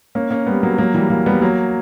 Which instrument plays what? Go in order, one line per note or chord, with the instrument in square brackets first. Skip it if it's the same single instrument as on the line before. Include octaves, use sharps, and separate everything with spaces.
[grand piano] A#3 C#4
A#3 C#4
G3 B3
F#3 A#3
F#3 A#3
E3 G3
F#3 A#3
G3 B3
F#3 A#3